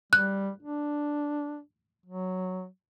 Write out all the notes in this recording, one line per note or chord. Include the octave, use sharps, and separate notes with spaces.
G3 F#6
D4
F#3